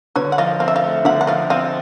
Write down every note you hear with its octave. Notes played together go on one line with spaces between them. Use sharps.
D3 B4 C#5
F#5
F3 D#5 F5
C4 F5
E5
D#5 F5
A3
D3 E5 F#5
F#5
F3 D#5 F5
C4 D#5 F5